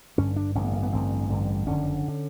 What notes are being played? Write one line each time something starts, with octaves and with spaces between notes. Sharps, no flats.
A1 G2 D3 C#4
D4
A1 G2 D3 C#4
B3
A#3
B3
A1 G2 D3 C4
A1 G2 D3
F#1 F2 D3 C#4
D3